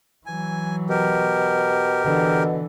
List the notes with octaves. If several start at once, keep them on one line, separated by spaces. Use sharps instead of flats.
E3 F#3 G#5
B2 G4 A#4
B2 D3 E3